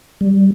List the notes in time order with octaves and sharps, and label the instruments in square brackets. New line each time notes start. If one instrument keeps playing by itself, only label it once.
[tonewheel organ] G3